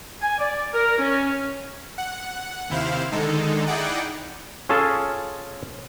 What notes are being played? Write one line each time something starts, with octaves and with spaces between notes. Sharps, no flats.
G#5
D5
A#4
C#4
F#5
D#2 C3 E4 C5 F5
D3 D#3 G#3 D#4 A4
D#4 E4 G#4 D5 F#5 G5
C#4 F4 G#4 A4 A5